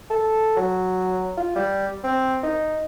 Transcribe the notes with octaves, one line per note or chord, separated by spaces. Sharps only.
A4
F#3
F4
G3
C4
D#4